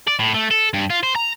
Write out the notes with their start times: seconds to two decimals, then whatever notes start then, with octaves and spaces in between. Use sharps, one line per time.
0.08 D5
0.19 A2
0.34 A3
0.51 A4
0.74 G2
0.90 F4
1.03 C5
1.16 A#5